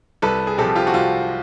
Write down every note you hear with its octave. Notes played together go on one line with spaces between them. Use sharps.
C2 A4 B4
G#4
C3 F3 G4 A4
F4 G4
F#4
C2 F4